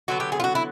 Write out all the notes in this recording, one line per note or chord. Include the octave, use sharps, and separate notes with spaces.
D3 F#3 B3 F#4
G4
G#4
F4
F#4
E4